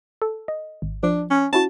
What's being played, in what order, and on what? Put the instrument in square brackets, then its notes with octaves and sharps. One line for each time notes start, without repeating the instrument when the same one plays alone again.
[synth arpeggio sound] A4
D#5
G#1
[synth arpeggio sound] F3 [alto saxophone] D4
[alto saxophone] C#4
[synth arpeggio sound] C#4 E4 F#4 [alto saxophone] A5